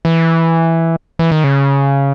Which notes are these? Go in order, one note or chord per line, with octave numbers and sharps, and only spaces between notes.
E3
E3
D#3
C#3